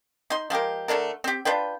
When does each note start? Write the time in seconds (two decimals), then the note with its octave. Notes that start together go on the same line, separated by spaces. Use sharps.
0.30 D#4 C6
0.50 F3 G#3 G4 A#4
0.88 D3 A3 D4 A#4
1.24 C4 G4
1.45 D4 F4 B4 G5